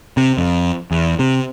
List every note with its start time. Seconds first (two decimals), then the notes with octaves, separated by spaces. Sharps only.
0.17 C3
0.38 F2
0.91 E2
1.19 C3